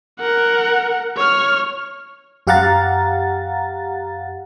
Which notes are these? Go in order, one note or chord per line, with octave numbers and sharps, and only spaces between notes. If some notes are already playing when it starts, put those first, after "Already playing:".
A#4 F#5
C#5 F6
F#2 G4 F5 F#5 A#5 A6